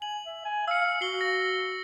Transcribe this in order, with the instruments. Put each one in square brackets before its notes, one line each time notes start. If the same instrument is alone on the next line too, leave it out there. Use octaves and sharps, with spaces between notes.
[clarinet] G#5 [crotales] F#7
[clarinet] E5
G#5
[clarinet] F5 [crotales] E6 C#7
[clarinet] F#4 [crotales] C7 G7
[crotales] A#6